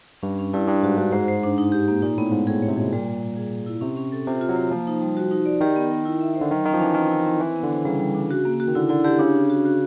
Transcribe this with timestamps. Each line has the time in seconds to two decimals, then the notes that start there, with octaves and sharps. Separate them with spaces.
0.23 G2 C#4
0.39 C#4
0.53 G2 E4
0.68 G2 D4
0.83 G#2 F#4
0.98 G2 F#4
1.12 G#2 C5
1.28 C5
1.43 D4
1.58 D#4
1.72 G4
1.88 A#3
2.02 A#2 D#4
2.18 A2 B3
2.32 G#2 B3
2.47 A2 G#4
2.62 C#5
2.68 C3
2.77 B2 G#4
2.93 A#2 G3
3.07 G3
3.22 G3
3.36 G#4
3.52 G#4
3.66 E4
3.81 C3 C#4
3.97 C#4
4.12 A4
4.27 C3 F4
4.41 F4
4.49 F#3
4.56 C5
4.71 F3 A#3
4.87 D#4
5.02 G3
5.17 F#4
5.31 D#4
5.46 D5
5.61 D#3 G4
5.76 B3
5.91 A#4
6.05 E4
6.21 E5
6.36 C5
6.41 D3
6.50 D#3 F#3
6.66 D#3 C#4
6.74 F3
6.80 E3 C#4
6.95 D#3 C4
7.10 E4
7.26 C4
7.40 E3 C5
7.55 B3
7.63 D3
7.71 C5
7.85 C#3 G3
8.00 G3
8.15 D4
8.31 F#4
8.45 A#3
8.60 F#4
8.68 D#3
8.75 D3 E4
8.89 D3 E4
9.04 D3 G4
9.19 C#3 D4
9.35 D4
9.50 F#4
9.65 F#4